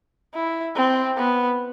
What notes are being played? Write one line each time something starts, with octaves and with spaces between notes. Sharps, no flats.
E4
C4
B3